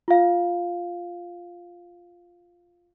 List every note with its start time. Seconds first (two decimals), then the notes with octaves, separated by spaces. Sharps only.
0.08 F4 F5